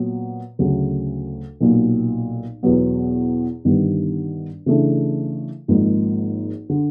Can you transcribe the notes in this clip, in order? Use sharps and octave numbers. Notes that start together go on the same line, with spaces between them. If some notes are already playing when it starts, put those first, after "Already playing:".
Already playing: A#2 F#3 B3
D2 C#3 F#3 A3
B1 A#2 F#3
E2 B2 F#3 B3
G1 G2 D#3 G3 B3
C#3 E3 A3 D4
G#1 G#2 F3 A#3 D#4
D3